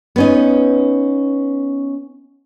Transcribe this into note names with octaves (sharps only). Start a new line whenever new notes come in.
B3 C#4 D#4